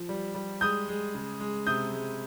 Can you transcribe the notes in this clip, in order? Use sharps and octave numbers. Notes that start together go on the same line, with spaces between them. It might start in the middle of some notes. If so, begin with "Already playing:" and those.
Already playing: F3
G3
G3
G#3 D#6 G6
G#3
C#3
G#3
C3 D#6 G6
G#3